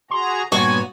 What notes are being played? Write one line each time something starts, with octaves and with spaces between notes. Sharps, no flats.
F#4 G#4 A#5 C6
G2 A#2 B3 F#4 C#5 G#5 C#6